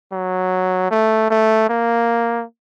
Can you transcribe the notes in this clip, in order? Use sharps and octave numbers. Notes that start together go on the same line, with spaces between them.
F#3
A3
A3
A#3